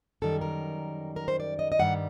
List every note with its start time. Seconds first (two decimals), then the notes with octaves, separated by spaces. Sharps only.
0.22 F#2 D#3 G3 A4
0.41 A#4
1.16 A#4
1.28 C5
1.40 D5
1.59 D#5
1.72 D#5
1.79 G2 D#3 G3 F#5